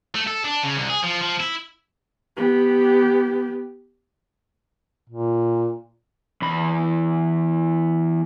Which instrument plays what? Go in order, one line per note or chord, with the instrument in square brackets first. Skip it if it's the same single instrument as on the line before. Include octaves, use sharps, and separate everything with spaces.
[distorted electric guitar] A3
A4
D4
C#3
C2
G#4
F3
F3
E4
[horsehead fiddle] B3 G4
[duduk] A#2
[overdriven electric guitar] E2 B5